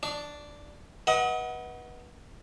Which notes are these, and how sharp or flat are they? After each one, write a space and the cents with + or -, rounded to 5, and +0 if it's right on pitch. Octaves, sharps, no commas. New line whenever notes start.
D4 +0 C#6 +40
B4 -25 D#5 +35 F#5 +0